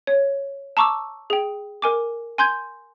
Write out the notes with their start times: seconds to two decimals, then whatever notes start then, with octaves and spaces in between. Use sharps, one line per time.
0.07 C#5
0.77 A5 A#5 C#6 D6 E6
1.30 G#4 G5
1.82 A#4 G#5 D6
2.38 G#5 C6 G6 G#6